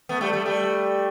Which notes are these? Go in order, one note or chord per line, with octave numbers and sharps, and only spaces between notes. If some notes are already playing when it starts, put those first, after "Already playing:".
A3 B3
G3 A3
G3 A3
G3 A3